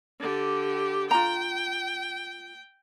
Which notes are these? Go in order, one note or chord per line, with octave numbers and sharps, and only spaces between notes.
D3 G4
F4 G5 A#5